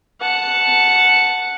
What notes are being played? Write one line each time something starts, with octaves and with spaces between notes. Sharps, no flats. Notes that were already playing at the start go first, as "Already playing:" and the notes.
F#5 A5